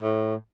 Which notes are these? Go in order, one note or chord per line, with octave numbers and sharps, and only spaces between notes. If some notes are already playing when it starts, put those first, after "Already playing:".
A2